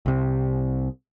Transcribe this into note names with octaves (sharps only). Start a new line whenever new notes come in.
C2 C3